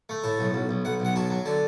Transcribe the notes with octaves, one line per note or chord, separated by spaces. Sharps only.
A3
A2 A5
B1
B1
B1
B1 F#5
B1 F#5
F#3 A5
F#3
D3 A5